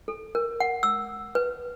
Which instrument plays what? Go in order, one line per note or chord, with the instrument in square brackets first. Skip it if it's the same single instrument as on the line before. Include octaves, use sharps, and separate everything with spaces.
[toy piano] A4
A#4
F#5
E6
B4